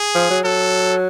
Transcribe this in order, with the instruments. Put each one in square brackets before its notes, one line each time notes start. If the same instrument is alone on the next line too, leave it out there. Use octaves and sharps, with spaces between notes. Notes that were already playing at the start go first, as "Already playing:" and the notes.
Already playing: [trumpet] G#4
[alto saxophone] F3
F#3
[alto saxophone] F#3 [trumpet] A4